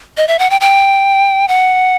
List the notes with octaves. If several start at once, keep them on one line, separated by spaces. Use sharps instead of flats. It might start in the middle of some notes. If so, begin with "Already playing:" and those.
D#5
E5
F#5
G5
G5
F#5